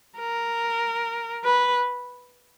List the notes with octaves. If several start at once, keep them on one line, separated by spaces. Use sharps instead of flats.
A#4
B4